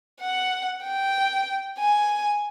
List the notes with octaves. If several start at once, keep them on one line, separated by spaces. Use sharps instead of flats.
F#5
G5
G#5